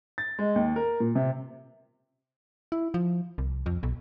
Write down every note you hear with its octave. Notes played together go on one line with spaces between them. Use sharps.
A6
G#3
D#2
A#4
A#2
C3
E4
F3
C2
F2
B1